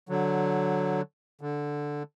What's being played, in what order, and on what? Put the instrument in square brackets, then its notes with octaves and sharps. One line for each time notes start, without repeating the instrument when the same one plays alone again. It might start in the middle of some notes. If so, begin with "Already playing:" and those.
[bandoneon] D3 F#3
D3